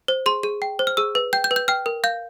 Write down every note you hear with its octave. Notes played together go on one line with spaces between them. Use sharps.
C5
G#4 C6
G#4
G5
C5
F6
G#4 E6
B4
G5 G6
G6
B4
G6
G5 F6
A#4
F5 G6